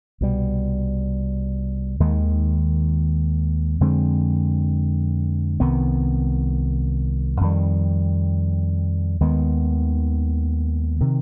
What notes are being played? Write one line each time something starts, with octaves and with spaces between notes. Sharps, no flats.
C2 B2 G3
D#2 D#3 G#3
F2 D3 G#3 C4
C2 C3 D#3 B3
F2 D#3 G3
D#2 D#3 G#3 B3
C3 D#3